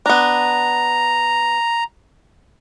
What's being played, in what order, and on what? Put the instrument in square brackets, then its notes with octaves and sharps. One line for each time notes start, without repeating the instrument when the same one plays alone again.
[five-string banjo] B3 D4 [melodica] A#5